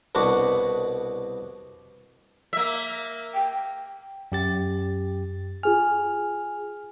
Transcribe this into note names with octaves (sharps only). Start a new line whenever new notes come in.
C2 B2 D4 F#4
A#3 E5
G5
F#2 G4 A6
F4 G#4 G#5 F6